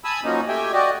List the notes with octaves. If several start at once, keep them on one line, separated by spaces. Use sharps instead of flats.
G#5 A5 B5 D#6 E6
F3 F#3 A#3 C#4 D#4
A3 G4 E5 G5 G#5
F#4 G4 D5 D#5